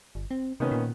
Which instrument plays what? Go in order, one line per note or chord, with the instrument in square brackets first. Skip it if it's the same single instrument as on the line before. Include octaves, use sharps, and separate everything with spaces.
[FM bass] G1
C4
[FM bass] C3 [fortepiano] D#3 B3 C#4
[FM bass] A#2